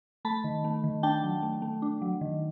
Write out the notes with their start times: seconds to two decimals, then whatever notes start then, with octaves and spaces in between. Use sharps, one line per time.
0.25 A3 A5 B5
0.44 D#3
0.64 A3
0.84 D#3
1.03 D4 G5 A5
1.23 F#3
1.43 A3
1.62 A3
1.82 D4
2.02 F#3
2.21 D#3